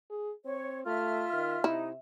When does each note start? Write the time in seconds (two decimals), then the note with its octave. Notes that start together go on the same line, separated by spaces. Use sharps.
0.10 G#4
0.46 C4 C#5
0.86 A3 F4 E5 F6
1.33 D#3
1.64 C3 D#4 E4